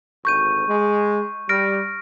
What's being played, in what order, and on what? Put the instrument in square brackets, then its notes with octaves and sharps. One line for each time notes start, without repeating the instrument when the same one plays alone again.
[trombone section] G#1 D2 [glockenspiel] C#6 G6 D#7
[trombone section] G#3
[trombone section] G3 [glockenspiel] F6 A#6 D7